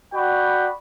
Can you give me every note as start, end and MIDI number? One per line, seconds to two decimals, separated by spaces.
0.13 0.68 66
0.13 0.68 74
0.13 0.68 79
0.13 0.68 83